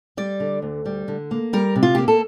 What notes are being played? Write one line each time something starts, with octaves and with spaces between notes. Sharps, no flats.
G3 D5
D3
D2
G3
D3
A#3
G3 A#4
C3
F4
A#3 G4
A4